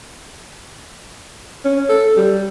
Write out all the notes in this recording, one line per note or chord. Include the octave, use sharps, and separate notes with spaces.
C#4
A4
G3